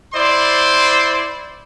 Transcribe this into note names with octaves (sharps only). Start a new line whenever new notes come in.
E4 C5 D5 C6